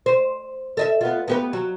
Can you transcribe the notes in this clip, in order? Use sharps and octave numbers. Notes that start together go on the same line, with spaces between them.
C5
A4 D#5 E5
B3 F4
B3 G4 B4
F#3